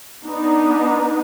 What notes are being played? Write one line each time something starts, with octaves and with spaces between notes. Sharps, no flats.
B3 D4 D#4